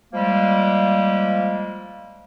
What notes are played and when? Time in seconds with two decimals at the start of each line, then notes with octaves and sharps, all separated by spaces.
0.13 F3 G3 G#3 A#3